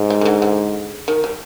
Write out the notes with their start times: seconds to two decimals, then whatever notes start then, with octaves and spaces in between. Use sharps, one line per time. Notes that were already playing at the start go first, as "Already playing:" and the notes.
Already playing: G#2
0.10 G3
0.21 D#3
0.25 D3
0.42 D3
1.08 D#3
1.24 G3